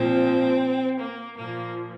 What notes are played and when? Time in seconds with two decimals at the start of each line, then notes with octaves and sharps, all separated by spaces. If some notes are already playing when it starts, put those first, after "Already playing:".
Already playing: A#2 F3 C4
0.99 A#3
1.37 A#2 F3 A#3